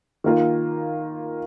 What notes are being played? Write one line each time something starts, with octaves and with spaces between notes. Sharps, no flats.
D#3 A#3 F4